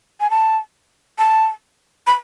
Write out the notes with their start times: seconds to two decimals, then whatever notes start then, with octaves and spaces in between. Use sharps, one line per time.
0.20 G#5
0.30 A5
1.19 A5
2.07 B5